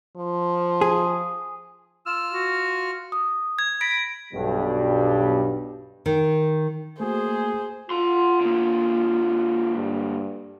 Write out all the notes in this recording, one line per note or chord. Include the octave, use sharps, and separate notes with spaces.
F3
G#4
F4 E6 F6
F#4
D#6
G#6
B5 A#6 D7
B1 G2 B2 G3
D#3
A3 A#3 F#4 G#4 C5
F4 F#5 C6
D3 A#3
G2